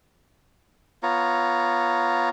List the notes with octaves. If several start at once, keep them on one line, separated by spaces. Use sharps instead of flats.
B3 F4 C#5 A#5